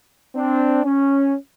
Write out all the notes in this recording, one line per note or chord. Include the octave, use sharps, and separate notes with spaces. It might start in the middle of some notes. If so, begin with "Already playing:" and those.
C4 D4
C#4